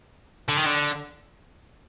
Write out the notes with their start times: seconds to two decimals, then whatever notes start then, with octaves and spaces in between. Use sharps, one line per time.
0.49 D3
0.57 D#3
0.66 D3